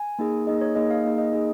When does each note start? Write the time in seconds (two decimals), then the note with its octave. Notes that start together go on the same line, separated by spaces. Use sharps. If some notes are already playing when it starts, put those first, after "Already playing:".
Already playing: G#5
0.19 A#3 D#4 G#4
0.47 A#3 D#4 G#4 D#5
0.61 C#5
0.75 A#3 D#4 G#4 D#5
0.91 F5
1.04 A#3 D#4 G#4
1.18 D#5
1.33 A#3 D#4 G#4